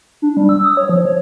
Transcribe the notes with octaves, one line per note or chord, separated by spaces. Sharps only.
D4
G3
E6
D#6
C#5
F3
C#5